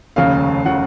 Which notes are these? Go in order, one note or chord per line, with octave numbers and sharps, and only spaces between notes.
F1 D#2 C#3 F5
C#3 F#5